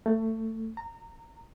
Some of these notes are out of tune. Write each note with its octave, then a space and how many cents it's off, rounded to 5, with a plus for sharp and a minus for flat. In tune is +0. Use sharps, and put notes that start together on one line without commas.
A3 +20
A#5 -25